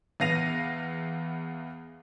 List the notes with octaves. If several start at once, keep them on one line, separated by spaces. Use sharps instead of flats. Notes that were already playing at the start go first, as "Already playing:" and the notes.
E2 B3 F5 A#6 D#7 F7